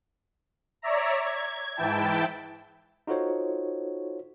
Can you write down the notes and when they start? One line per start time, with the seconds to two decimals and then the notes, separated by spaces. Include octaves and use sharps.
0.82 C#5 D5 E5 A#5
1.24 G#6
1.76 G#2 E3 E4 G5 A5
3.07 D#4 F4 F#4 A4 C5 C#5